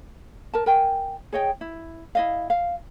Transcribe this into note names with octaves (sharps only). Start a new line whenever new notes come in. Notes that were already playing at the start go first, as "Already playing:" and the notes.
A#4 A5
A#4 G5 G#5
G#4 C#5 D#5 G5
E4
E4 D#5 F5
F5